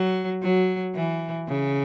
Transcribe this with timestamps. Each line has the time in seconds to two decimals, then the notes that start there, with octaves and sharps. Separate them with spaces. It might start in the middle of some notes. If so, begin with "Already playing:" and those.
Already playing: F#3
0.42 F#3
0.95 E3
1.48 C#3